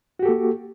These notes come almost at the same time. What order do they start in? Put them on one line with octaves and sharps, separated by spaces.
F#4 G4 A4 A#3